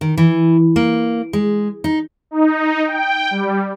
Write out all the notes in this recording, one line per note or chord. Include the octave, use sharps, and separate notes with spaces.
D#3
E3
A#3
G#3
D#4
D#4
G5
G3